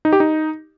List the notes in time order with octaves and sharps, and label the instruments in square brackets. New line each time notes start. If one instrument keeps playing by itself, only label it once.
[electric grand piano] D#4
G4
D#4